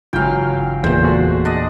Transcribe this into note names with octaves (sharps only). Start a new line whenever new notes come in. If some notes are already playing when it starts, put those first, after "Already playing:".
G1 G#2 C#3 E3 F#3 F4 F5 G5
E2 A#2 C5
G#3 A3 F#4
D4 D#5